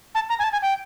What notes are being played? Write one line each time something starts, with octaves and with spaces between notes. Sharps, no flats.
A5
A#5
G#5
A5
G#5
G5